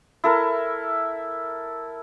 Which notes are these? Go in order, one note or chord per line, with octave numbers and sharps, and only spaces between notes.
E4 A4 A#4